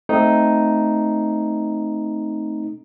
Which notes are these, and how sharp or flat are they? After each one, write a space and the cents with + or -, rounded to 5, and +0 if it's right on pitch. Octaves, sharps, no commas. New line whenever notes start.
A3 +0 C4 -5 D#4 +0